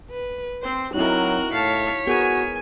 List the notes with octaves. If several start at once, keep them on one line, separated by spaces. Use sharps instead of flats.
B4
C4 C5
F#3 C4 D#4 E4 F#4 A#4 F#6
A2 C#5 F5 A5 B6
B3 F#4 G#4 A#4 G#5